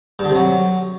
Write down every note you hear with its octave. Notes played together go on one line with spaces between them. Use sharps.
G2
D3
C3
F#3